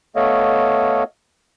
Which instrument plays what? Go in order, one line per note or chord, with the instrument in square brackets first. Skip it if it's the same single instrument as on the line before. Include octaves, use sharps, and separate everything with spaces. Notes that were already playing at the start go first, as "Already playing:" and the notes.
[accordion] A3 B3 A4 C#5 D#5 F5